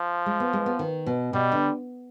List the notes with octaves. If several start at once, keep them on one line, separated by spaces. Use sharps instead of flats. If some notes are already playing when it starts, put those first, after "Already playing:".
Already playing: F3
G#3
B3
G#3
B3
D#3
B2
B2 G3
D3